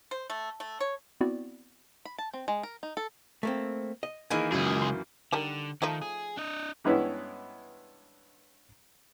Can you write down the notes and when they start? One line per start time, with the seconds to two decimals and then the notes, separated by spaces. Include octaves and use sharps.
0.11 C5
0.30 A3
0.60 A3
0.80 C#5
1.21 B3 C4 E4 F#4 D5
2.05 B5
2.18 A5
2.34 C4
2.48 G#3
2.63 A#4
2.83 D#4
2.97 A4
3.43 A3 A#3 C4
4.03 D#5
4.30 D#3 E3 A#3 D#4 G#4
4.52 C#2 F#2 G#4
4.82 C6
5.32 D3 D#3 G3 A#4
5.82 D#3 F3 A3 D#4
6.02 G#4
6.37 D4 D#5
6.84 G2 E3 G#3 B3 C#4 E4